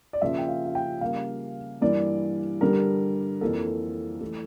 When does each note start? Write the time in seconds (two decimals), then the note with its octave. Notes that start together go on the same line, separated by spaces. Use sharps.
0.13 D5
0.21 C#3 F3 A#3 E5
0.38 G5
0.49 F5
0.65 F5
0.75 G5
1.01 C#3 G3 A#3 F5
1.81 G2 E3 A#3 D5
2.61 G2 D3 G3 A#4
3.41 F2 E3 A#3 A4
4.21 E3 A3